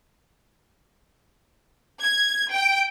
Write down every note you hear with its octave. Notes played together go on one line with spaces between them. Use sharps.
G#6
G5